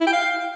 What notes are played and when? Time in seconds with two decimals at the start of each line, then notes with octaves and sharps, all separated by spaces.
0.01 E4
0.07 G5
0.13 F5